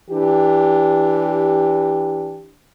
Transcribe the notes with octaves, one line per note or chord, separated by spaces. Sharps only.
E3 D4 G4